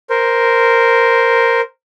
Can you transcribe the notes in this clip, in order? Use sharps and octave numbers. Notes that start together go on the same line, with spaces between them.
A#4 C5